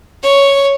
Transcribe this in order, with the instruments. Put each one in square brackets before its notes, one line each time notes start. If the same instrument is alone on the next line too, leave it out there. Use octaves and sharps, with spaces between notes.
[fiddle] C#5